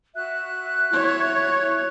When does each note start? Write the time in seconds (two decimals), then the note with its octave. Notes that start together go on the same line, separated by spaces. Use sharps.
0.15 F#4 E5 F#6
0.93 E4 C#5